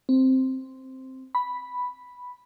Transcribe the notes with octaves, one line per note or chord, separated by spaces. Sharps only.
C4
B5